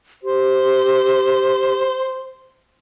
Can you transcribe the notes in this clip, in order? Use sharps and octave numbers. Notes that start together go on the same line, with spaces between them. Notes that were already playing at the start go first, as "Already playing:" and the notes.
G4 C5